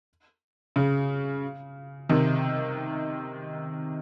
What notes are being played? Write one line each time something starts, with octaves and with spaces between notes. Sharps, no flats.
C#3
C3 D#3